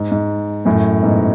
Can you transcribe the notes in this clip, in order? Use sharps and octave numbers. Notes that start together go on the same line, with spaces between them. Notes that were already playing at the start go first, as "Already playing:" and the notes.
Already playing: G#2
G#2
F#2 A2
G#2 B2